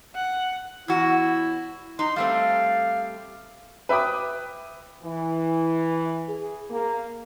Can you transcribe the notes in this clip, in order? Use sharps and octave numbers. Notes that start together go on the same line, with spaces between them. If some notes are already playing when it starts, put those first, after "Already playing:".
F#5
E2 E4 F#4
D#4 C6
G3 A3 C4 F5
B4 E5 G5 D6 D#6
E3
G#4
A#3